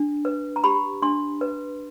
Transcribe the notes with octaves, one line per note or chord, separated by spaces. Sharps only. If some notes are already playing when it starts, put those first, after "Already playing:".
Already playing: D4
B4
A#5
G4 B5
D4 C6
B4